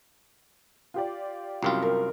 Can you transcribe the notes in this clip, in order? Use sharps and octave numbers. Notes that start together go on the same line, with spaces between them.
F4 G4 D5
C2 F#2 F4 G4
A#4